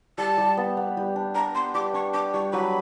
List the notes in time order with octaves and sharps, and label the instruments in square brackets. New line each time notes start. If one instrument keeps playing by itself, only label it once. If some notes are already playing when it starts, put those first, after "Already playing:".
[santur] G3 [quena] A5
[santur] G3
B3
B3
G3
D4
[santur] D4 [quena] A#5
[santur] B3 [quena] C6
[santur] G3 [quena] D6
[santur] D4 [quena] C#6
[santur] D4 [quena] D6
[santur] G3 [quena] C#6
[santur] F#3 [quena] B5